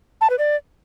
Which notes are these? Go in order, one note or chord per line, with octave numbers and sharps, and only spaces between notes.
A5
B4
D5